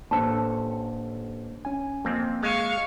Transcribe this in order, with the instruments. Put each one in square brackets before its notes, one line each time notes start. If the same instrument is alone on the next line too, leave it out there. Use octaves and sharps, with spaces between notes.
[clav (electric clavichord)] A1 A4 [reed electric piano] A#3 D4 C5 [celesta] A5
[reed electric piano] C#4 G#5
[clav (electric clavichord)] F2 C4 [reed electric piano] A#3
[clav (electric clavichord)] G#3 [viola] F5 C#6